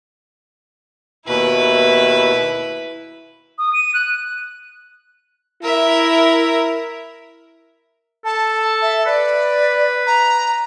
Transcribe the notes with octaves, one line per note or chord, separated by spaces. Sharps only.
D#2 B2 E4 B4
D#6
D#7
F#6
E4 A#4 E5
A4 A5
E5
B4 D5
A#5